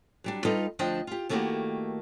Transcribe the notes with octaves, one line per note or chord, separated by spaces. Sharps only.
F#3 G3 D4
G3 D#4 F4 A4 B4
D2 F3 D4 C5 D#5 G5
F4 G4
D#3 A3 A#3 E4 F#4 G4